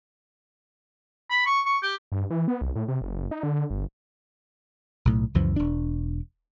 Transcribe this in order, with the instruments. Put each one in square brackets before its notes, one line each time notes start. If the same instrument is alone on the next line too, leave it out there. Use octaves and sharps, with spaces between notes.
[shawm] B5
C#6
C#6
G4
[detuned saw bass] G2
E3
B3
C2
A2
C3
F#1
D#4
D3
G1
[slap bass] B1 A2
C#2 F#2 E3 F3
E1 D4